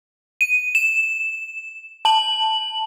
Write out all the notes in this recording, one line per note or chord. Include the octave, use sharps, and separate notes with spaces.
D#7
E7
A5 F#7